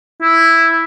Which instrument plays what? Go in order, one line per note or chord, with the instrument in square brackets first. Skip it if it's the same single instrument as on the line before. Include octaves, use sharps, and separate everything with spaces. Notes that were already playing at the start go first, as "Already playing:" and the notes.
[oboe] E4